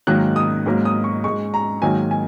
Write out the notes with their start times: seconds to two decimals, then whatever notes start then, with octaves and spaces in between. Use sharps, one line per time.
0.07 G#2 D#3 F#3 A#3 F#6
0.36 D#6
0.66 G#2 F#3 A#3
0.85 D#6
1.04 C#6
1.24 G#2 G#3 C#6
1.54 A#5
1.82 G#2 D#3 F#3 A#3 G#5
2.11 G#5